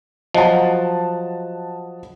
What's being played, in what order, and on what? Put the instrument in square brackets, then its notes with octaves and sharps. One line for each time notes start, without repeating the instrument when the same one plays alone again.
[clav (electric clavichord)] F3 F#3 [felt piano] D#5 F#5 A5